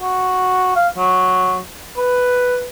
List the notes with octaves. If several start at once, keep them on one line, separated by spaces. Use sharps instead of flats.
F#4
F5
F#3
B4